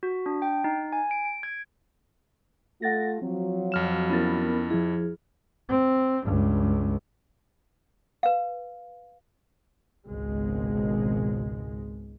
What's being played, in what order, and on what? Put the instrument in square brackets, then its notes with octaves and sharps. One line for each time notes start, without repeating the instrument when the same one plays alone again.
[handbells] F#4
D4
G5
D#4
G#5
D7
D7
G#6
[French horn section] A3 F4 [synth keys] F#5 A6 A#6
[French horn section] F3 F#3 [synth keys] C4
[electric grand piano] F2 F6 E7
[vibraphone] B3 A#4 [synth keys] C#4 E4 A6
[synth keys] F3 E4 [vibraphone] G#4
[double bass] C4
C#2 G2
[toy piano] B4 F5
[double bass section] G#1 C#2 B2 G#3